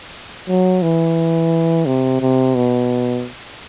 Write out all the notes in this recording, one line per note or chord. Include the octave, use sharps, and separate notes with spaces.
F#3
E3
C3
C3
B2